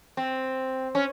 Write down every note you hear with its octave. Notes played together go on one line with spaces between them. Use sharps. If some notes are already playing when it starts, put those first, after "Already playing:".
C4
C#4